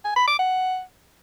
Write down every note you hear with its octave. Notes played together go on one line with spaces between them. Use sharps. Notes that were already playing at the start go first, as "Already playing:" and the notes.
G#5
B5
D6
F#5